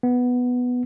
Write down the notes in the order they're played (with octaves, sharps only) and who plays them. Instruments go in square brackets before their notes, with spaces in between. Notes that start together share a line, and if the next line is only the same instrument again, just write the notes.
[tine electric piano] B3